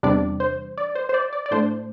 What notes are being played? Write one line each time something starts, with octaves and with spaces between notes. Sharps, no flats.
E2 C3 G3 D4 D5
C5
D5
C5
C5
D5
D5
D5
A2 A3 D4 C5